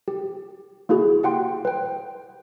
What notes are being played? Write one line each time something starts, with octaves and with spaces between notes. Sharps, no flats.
G4
A#3 E4 F#4 G#4
G4 F#5 G5 C6
B4 G5